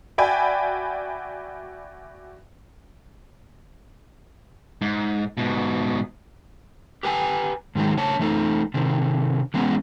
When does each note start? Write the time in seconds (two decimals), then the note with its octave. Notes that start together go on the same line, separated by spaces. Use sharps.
0.18 F#4 D5 E5 G5 G#5 B5
4.82 G#2
5.38 G#2 B2
7.03 G4 B4 G5 G#5
7.75 G#2 D#3 F#3 G#3
7.97 C#3 D4 C#5 A5
8.19 E3 A3 D#4 A4
8.74 C3 D#3 D4
9.54 E3 G#3 B3 C#4